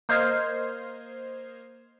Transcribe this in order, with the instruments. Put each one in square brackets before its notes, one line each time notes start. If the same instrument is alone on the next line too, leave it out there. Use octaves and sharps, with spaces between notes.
[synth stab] A#3 C5 D#5 F6 G#6 C7